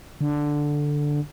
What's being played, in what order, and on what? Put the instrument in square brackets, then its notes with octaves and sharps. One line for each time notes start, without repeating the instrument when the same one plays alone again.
[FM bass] D3